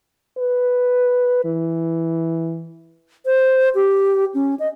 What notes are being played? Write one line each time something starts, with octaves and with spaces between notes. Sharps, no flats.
B4
E3
C5
G4
C#4
D#5